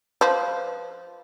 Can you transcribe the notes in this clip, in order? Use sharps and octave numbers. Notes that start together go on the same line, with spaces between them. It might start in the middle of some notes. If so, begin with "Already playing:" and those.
F3 B4 C5